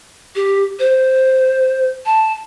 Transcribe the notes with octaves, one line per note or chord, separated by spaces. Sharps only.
G4
C5
A5